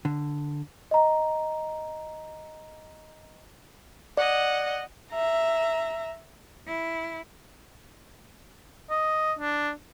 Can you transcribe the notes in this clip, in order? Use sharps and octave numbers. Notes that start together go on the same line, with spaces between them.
D3
D#5 A#5
D5 D#5 F#5
E5 A#5
E4
D#5
D4